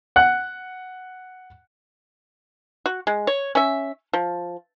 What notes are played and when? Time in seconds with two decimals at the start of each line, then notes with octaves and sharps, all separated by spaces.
0.16 F#5 F#6
2.86 F#4
3.07 G#3
3.27 C#5
3.55 C#4 E5
4.13 F3